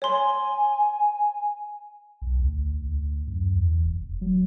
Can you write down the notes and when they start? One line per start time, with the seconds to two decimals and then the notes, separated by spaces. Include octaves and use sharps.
0.02 C#5 G#5 C6
2.22 B1
2.39 D2
2.86 D2
3.27 F#2
3.56 E2
3.85 F1
4.21 F#3